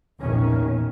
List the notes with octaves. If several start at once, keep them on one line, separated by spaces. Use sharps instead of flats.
A#1 E2 B2 D#3 C#4